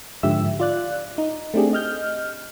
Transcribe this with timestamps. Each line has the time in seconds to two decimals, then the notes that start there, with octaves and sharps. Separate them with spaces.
0.23 G#2 D3 F3 G4 E5 E6
0.60 F4 D5 F#6
1.18 D#4
1.54 A3 C4 D4 G4 G#4
1.73 D#5 F6 G6